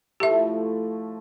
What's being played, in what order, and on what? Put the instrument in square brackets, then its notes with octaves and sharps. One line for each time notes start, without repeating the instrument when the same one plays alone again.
[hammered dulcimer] A2 F3 A3 [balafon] G4 E5